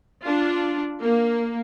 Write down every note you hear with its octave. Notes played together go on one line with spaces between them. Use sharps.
D4 F4
A#3